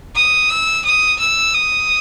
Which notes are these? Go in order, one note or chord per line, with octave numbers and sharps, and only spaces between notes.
D#6
E6
D#6
E6
D#6